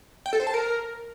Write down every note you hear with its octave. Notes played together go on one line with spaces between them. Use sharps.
G5
A4
C5
A5
A#4